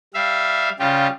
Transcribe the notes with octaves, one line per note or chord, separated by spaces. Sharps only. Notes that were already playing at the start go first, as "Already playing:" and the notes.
G3 E5 F5
C#3 G3 F4 G4